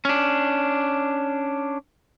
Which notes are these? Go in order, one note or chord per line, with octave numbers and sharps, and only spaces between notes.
C#4 D4